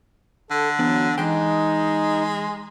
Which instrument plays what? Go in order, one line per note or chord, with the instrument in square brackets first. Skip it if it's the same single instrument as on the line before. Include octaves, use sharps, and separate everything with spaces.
[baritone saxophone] D3 [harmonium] A4
[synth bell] E3 B3 D4 [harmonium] F#3
[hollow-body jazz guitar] E3 G5 [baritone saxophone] G#3 [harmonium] D#4 [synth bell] G#5 F#6